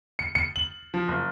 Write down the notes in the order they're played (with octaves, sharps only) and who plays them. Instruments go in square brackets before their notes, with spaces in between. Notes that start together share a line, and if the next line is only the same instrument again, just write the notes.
[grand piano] C#7
C#7
F#7
F3
F#1